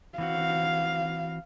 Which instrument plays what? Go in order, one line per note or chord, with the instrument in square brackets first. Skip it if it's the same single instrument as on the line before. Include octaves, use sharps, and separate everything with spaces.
[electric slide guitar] E3 C4 F#4 [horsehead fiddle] F5